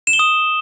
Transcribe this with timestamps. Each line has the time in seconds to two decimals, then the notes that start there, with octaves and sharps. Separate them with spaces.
0.07 E7
0.13 G7
0.19 D#6